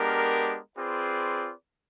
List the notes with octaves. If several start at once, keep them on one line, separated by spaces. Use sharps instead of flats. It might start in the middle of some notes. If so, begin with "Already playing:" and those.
Already playing: G#3 B3 D4 G4 A#4
C4 F4 G#4 B4 D5